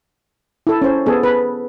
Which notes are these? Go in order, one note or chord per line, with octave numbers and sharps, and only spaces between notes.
E4 A4
C#4 C5
B3 G#4 A4
B4